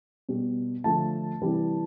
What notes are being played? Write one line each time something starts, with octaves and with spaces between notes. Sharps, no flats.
B2 G3
D3 F3 A3 A5
C3 E3 G3